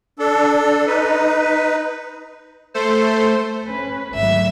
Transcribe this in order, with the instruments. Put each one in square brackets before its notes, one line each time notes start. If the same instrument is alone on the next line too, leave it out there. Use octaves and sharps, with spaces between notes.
[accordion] D4 A4
D#4 B4
[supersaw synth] A3 A4 C5
[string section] C#4 B4
[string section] G#1 D2 F#3 [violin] E5